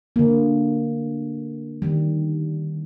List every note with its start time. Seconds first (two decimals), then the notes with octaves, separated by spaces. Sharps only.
0.16 D3 A#3
1.82 D#3 G3